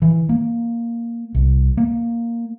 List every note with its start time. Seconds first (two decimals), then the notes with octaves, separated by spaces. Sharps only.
0.02 E3
0.29 A#3
1.35 C2
1.77 A#3